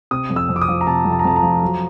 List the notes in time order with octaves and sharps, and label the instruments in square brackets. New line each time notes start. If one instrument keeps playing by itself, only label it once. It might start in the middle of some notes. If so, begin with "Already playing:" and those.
[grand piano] C3 D#6
F2
E6
F2
D6
D#6
F3
A#5
C3 A5
F2
A5
A#5
F2 A5
A#5
F3
F#3